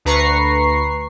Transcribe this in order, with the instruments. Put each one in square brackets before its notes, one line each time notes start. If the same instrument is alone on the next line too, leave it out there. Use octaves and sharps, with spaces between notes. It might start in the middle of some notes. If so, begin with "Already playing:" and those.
[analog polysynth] D2 B4 A#5 C#6 C7